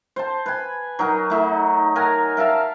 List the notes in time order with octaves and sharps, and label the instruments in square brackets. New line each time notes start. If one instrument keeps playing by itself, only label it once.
[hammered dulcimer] C5 A5
B4 G#5
F#3 D#4 A#4
A3 D#4
A#4 F#5 G#5 A#5
A#4 E5 F5 A5